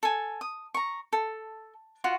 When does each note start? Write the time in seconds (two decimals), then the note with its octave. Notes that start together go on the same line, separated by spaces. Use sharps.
0.03 A4 G#5
0.41 D#6
0.74 A#5 C#6
1.13 A4
2.04 F4 F#4 F#5